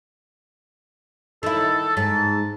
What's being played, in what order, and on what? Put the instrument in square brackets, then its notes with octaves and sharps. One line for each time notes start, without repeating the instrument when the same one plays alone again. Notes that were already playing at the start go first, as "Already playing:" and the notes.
[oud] D#3 E4 [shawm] A4
[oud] G#2 [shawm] A5